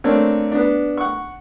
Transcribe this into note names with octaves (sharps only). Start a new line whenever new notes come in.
A3 A#3 C4 D4 C#5
B3 D4
F#5 C#6